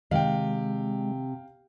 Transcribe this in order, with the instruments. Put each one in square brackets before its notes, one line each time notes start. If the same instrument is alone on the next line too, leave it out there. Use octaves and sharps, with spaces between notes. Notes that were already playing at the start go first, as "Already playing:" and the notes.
[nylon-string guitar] C3 [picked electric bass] D#3 [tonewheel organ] G#3 [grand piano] F5 G5